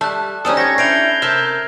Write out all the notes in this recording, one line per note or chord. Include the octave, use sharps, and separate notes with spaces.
G3 A3 A5 F#6
G3 C4 C#4 D#4 G#4 A4 D#6
G4 C#6 G#6 A#6
C#4 D4 E4 G6 C7 D7 F7
C3 A#4 E5 A5 F6